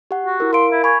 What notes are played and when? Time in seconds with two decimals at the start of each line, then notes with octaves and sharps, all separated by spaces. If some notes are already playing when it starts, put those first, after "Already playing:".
0.11 G4 F#5
0.26 F#4
0.40 E4 A#4
0.53 A#4 F5 C6 D7
0.72 E4
0.84 G#5 B5 C#6